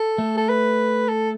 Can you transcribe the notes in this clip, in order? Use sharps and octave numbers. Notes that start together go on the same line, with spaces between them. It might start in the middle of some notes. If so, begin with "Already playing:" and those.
Already playing: A4
A3
A4
B4
A4